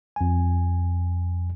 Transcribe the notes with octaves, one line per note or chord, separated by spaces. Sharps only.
F2 G#5